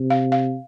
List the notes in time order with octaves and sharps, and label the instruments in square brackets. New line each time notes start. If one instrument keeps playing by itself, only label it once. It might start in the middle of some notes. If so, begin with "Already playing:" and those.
Already playing: [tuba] C3
[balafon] F5
F5